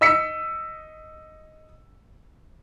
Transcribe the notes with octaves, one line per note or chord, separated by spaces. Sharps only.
D#5 E6 B6 C#7